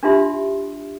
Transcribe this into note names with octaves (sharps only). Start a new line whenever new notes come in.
D4 D#4 F4 G4 E5 C6